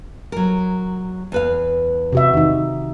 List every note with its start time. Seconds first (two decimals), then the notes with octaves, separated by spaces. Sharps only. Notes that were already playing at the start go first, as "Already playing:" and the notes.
0.32 F#3 A#4
1.32 E2 B4 F5
2.12 C3 F#4 E5
2.34 D#3 D#4